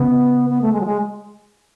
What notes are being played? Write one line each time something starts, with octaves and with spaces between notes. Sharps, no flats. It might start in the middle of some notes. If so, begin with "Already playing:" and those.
Already playing: C#3 B3
B3
A3
G#3
F#3
G#3